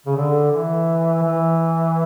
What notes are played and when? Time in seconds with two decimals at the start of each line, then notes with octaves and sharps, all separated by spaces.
0.06 C#3
0.16 D3
0.51 E3
1.23 E3